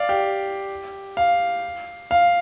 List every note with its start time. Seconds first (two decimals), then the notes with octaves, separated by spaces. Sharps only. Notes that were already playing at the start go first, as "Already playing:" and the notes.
Already playing: D5 F5
0.09 G4
1.17 F5
2.11 F5